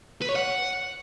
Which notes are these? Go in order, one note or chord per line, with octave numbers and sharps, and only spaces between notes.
B4
C#5
F#5